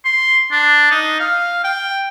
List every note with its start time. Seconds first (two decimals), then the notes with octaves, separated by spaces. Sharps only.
0.05 C6
0.51 D4
0.91 D#4
1.20 F5
1.64 G5